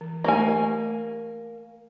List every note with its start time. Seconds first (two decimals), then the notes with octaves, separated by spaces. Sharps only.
0.01 E3
0.24 A3 A#3 G4 D5 G#5